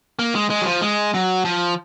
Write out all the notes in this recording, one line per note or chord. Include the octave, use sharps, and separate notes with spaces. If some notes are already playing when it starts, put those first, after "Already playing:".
A#3
G#3
G#3
F#3
F3
G#3
F#3
F3